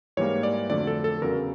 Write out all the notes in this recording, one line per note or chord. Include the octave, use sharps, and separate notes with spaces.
G#2 E3 G3 A#3 C#5
D5
F2 D3 F#3 A3 D5
A4
A4
E2 C#3 F#3 A#4